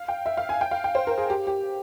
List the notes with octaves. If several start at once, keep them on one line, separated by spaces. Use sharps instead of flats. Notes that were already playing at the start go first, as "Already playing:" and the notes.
Already playing: F5
G5
E5
F5
G#5
G5
F5
G5
C5
A#4
G#4
G4
G4